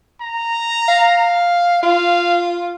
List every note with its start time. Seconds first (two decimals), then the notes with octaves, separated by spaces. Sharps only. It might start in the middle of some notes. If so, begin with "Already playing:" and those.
0.21 A#5
0.88 F5
1.83 F4 F5